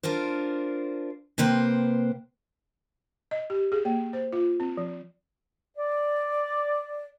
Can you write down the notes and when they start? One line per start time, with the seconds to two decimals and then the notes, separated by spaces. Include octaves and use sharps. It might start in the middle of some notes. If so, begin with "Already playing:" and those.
0.03 D4 F4 A#4 C5
1.38 C3 A#3 B4 C5 G5
3.31 D#5
3.50 G4
3.72 G#4
3.85 A#3
4.13 C5
4.33 F4
4.60 C4
4.77 F3
5.78 D5